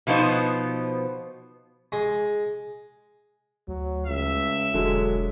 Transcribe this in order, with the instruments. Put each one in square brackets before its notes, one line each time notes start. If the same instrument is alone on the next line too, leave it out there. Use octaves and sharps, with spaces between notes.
[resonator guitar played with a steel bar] B2 F3 B3 D#4 C5
[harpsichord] G#3
[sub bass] D2 [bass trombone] F#3
[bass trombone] C#2 [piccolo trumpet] E5
[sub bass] E1 [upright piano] D3 F#3 [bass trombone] G#3